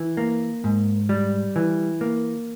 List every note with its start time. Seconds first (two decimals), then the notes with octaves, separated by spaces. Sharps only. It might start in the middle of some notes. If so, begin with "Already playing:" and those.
Already playing: E3
0.17 A#3
0.64 G#2
1.09 G3
1.56 E3
2.01 A#3